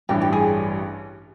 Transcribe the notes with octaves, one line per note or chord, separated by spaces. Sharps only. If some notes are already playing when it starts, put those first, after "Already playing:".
A1 G2 E3 G4
G4
G#4